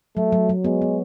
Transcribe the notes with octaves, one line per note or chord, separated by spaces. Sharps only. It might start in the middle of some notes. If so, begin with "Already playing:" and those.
F#3 A3
F#3
F#3
G#3 B3
B3